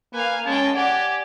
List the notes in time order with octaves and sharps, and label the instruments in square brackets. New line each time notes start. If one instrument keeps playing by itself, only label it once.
[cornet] A#3 [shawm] B4 [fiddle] F5 G#5
[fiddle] G#3 G5 [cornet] C#4 [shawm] A5
[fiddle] G4 D5 [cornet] F#5 [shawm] G#5